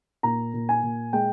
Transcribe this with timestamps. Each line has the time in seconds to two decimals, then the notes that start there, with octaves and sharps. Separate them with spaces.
0.23 A#2 A#5
0.54 A#2
0.69 G#5
0.83 A#2
1.13 G#3 G5